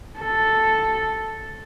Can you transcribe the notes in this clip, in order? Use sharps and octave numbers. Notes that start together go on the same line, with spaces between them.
A4